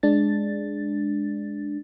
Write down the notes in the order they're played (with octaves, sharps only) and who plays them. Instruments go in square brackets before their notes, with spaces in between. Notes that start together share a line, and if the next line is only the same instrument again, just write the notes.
[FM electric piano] G#3 D4 A6